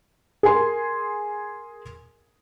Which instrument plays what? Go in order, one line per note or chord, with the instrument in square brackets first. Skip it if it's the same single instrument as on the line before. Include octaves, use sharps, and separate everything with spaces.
[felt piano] G#4 A#4 G#5 C6